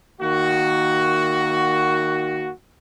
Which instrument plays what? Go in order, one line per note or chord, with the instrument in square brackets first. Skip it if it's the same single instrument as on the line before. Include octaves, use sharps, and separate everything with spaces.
[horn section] D#3 A#3 F#4